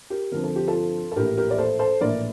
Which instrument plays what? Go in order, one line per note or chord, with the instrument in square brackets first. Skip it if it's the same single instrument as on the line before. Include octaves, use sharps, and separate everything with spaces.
[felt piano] G4 A#4
G1 G2 D3 F3 C4 A#4
A4
G4
F4 A4
A4
A#1 A2 E3 A#3 G4 A#4
G4 A#4
D5
A4 C5
A4 C5
A#1 A2 E3 A#3 A#4 D5